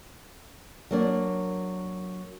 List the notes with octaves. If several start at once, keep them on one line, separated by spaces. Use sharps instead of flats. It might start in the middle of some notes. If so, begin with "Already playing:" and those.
F#3 A#3 D4